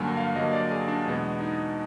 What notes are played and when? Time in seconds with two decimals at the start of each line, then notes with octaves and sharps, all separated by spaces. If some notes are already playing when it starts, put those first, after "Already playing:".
Already playing: G2 D3 F#3 A#3 F#5 G#5
0.17 F5
0.35 G2 D3 F#3 A#3 D#5
0.53 D5
0.71 G#4
0.88 D4
1.05 E2 B2 G#3 B3 D4
1.41 D#4